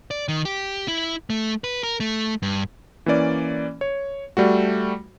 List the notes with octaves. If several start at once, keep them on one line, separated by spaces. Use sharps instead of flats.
D5
D#3
G4
E4
A3
B4
A#4
A3
G2
E3 A#3 C#4 D5
C#5
G3 A3 F#4